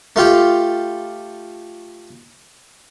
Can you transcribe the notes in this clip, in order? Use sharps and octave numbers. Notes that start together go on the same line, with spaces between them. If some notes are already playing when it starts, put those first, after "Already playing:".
A3 F4 G4